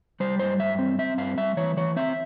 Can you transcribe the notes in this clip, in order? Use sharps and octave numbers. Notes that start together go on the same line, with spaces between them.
G3 C5
G2 C5
G2 E5
C4
C4 E5
G2 F5
G3 E5
E3 C#5
E3 C#5
C4 E5